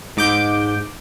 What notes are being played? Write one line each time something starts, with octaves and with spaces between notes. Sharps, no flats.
G#2 D6 G6